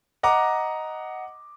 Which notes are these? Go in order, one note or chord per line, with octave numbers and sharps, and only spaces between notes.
D#5 F#5 A#5 D6